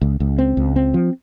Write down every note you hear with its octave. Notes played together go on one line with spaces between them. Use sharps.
C#2
C#2
C4
C#2
C4
F3